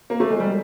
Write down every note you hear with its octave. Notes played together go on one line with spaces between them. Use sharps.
A#3
A3
G#3
G3